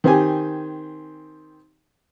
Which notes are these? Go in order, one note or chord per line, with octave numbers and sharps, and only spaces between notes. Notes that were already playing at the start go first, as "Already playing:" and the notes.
D#3 C4 G4 G#5